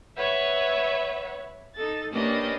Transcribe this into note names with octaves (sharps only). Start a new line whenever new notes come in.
B4 C#5 E5 F#5
D#4 A4 A6
A#3 C#4 D4 G4 B4 D#5